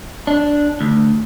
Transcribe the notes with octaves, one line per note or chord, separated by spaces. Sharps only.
D4
D2